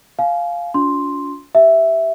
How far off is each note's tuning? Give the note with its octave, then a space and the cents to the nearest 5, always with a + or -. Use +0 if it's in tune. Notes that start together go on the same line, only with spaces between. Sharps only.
F5 +0 G#5 +35
D4 -45 F4 +35 C6 +0
G4 +0 E5 +0